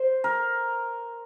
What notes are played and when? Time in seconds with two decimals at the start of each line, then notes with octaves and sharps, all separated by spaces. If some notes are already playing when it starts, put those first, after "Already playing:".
Already playing: C5
0.24 A#4